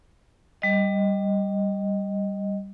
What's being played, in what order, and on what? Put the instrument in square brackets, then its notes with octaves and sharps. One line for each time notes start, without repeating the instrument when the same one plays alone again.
[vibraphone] G3 D#5